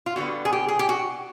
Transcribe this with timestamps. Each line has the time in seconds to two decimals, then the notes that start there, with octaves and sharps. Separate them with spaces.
0.06 F4
0.16 D3 G3 B3 F#4
0.45 G#4
0.53 G4
0.68 G#4
0.79 G4
0.89 F#4